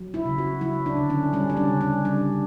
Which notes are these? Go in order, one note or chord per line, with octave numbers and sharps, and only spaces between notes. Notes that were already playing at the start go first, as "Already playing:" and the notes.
Already playing: F#3
E4
C#3
F#4
F#3 E4
D4
D3
C#4
G3 C#4
D4
C#4
C#3
C#4
G3 D4